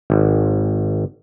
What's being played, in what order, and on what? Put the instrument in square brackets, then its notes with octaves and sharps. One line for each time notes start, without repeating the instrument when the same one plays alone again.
[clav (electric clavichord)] G#1